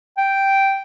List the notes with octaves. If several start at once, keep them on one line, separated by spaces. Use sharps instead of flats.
G5